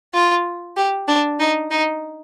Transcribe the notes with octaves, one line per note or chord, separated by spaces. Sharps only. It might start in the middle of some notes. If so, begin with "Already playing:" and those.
F4
G4
D4
D#4
D#4